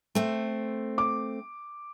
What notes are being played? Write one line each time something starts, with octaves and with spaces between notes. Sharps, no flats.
A3 C4
D6